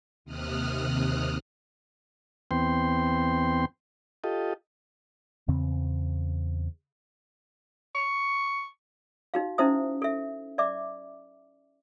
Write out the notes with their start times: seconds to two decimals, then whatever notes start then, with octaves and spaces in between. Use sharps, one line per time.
0.25 D#2 C3 D#6 F6 F#6
2.51 E2 B3 C4 G5 C6
4.24 F4 G4 A4 D#5
5.48 E2 C#3 C4
7.95 C#6
9.34 D#4 F#4 F5
9.58 C#4 D#4 E4 C5 E5 D#6
10.02 A4 E5
10.58 D5 E5 D6